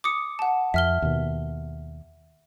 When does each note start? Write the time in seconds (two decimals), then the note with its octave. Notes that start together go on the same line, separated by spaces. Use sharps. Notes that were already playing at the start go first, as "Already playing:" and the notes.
0.04 D6 D#6 C#7
0.39 F#5 A5
0.74 F2 E5 F6 G7
1.02 D#2 B2